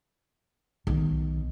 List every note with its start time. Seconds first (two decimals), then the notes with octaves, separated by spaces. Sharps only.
0.87 B1 D#3